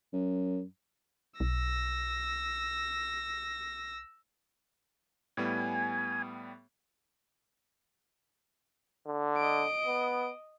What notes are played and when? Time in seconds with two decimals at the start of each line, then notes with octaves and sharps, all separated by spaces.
0.13 F#2
1.40 B1 E6 A#6
5.37 A2 G3 B3 G#5
9.07 D3
9.37 D#5 D7
9.87 B3